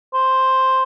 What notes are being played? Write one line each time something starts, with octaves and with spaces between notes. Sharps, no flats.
C5